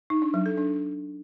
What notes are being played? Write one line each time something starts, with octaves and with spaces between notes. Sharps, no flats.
D#4
D4
F#3
A4
D4